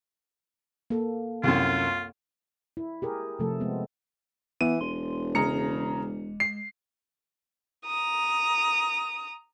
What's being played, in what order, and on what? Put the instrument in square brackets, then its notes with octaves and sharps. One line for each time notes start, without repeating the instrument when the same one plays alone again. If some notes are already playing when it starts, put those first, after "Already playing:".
[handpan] A#3 A4
[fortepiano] C2 F#2 [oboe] F4
[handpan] E4
G4 G#4 A#4
C3 F3 A3 A4
G#3 B3 C4
[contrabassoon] E3 [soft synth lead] B3 [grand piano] D#7
[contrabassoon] E1 [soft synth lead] C6
[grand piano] C#3 A#5 C#7 [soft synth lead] G#3
[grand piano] C7
[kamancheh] A#5 D#6